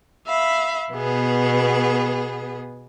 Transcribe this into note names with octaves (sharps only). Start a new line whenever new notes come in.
E5 F5 B5
B2 B3 G#4